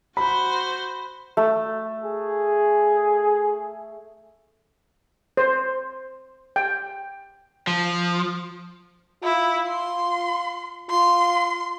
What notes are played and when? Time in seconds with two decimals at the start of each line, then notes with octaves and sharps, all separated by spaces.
0.17 F#4 C5 B5
1.37 A3
2.04 G#4
5.37 C5
6.56 G5
7.67 F3
9.23 E4 F4
9.68 C6
10.90 F4 C6